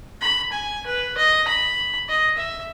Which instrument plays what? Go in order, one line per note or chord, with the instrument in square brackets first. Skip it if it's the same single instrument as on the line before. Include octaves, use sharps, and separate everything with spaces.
[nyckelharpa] B5
G#5
B4
D#5
B5
D#5
E5